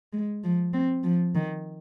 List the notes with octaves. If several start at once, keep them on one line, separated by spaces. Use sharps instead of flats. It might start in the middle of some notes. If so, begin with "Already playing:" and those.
G#3
F3
C4
F3
D#3